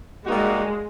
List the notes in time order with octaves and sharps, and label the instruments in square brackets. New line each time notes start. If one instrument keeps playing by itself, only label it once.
[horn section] G3 A#3 D#4 F#4 [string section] G#3